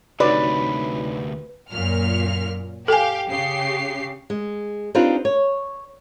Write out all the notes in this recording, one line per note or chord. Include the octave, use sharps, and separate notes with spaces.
D2 C3 D#4 F#4 B4 C#5 D5
F#2 A#2 F6
G4 A4 F5 G#5
C#3 G4 C7
G#3
C4 D4 D#4 F4 G4 B4
C#5